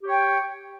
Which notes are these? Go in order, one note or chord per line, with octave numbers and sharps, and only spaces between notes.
G4 C#5 G5